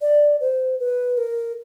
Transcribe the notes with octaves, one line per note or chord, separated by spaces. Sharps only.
D5
C5
B4
A#4